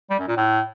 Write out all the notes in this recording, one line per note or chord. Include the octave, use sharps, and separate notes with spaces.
G3
F#2
A#2
A2